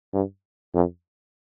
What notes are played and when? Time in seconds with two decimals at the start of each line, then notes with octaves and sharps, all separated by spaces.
0.14 G2
0.74 F2